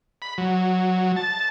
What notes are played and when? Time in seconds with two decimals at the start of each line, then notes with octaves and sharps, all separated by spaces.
0.22 B5
0.38 F#3
1.16 A5